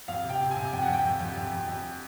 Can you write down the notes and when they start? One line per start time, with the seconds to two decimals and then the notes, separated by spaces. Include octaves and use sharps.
0.08 F2 F5
0.24 C3
0.29 G5
0.40 C3
0.51 C3 G#5
0.72 F2 G5
0.83 F#5
0.88 F2
0.93 G5
1.04 F2
1.20 F2
1.37 F2
1.52 F2
1.68 F2